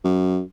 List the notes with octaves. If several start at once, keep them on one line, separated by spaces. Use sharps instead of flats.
F#2